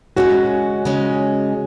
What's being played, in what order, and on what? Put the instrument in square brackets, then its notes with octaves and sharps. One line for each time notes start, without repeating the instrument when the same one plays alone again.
[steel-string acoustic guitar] C#3 G#3 C#4 [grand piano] F#4
[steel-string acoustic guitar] C#3 G#3 C#4